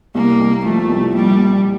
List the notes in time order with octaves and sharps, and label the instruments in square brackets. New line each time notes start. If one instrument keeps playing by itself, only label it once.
[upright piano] C2 [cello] A#3
[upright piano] C2
[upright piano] F3 [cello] A3
[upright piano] C2
[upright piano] A#1 [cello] G3
[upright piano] A#1